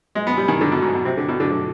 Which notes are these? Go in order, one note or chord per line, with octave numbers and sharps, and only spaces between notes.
G#3
B3
G3
D#3
D3
B2
G#2
B2
C3
D3
B2
D3
D3